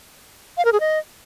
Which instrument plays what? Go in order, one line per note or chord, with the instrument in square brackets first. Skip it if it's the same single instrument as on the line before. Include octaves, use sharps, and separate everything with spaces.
[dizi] F5
A#4
G#4
D#5